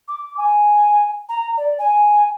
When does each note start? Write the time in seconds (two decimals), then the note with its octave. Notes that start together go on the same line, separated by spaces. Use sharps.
0.08 D6
0.37 G#5
1.29 A#5
1.57 D5
1.79 G#5